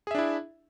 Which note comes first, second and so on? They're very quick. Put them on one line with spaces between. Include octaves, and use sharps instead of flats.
G#4 E5 D4 E4